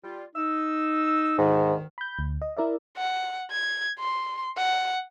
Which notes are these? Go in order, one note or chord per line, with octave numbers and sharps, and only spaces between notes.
G3 F4
D#4 E6
D2 G#2 D#3
B5 G6
D2
D#5
E4 A#4 D5 E5
F#5
G#6
C6
F#5